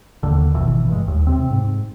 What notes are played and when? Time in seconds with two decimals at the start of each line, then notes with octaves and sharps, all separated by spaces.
0.23 D#2 D3
0.54 G#1 B2 D#3 E3
0.88 G2 G#3
1.08 D#2
1.27 C3 C4
1.51 G#2